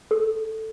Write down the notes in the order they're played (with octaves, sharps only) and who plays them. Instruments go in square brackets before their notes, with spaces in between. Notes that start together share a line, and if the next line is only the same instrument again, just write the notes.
[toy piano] A4